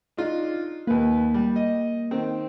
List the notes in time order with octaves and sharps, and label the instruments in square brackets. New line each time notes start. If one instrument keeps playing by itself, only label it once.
[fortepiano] D4 D#4 F4
[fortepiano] D#2 B4 [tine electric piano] A#3
[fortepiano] G3
D#5
D#3 C4